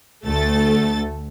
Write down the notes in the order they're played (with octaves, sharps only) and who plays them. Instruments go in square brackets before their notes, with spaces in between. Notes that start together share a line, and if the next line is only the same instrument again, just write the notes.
[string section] D2 A3 A4 A6